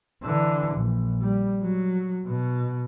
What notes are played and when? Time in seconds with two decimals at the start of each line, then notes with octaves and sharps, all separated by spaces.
0.24 D3 E3
0.75 A#1
1.21 G3
1.62 F#3
2.26 B2